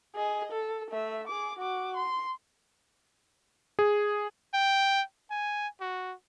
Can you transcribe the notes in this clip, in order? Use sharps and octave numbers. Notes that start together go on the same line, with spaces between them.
G#4 D#5
A4
A3 E5
G#4 D6
F#4 D6
C6
G#4
G5
G#5
F#4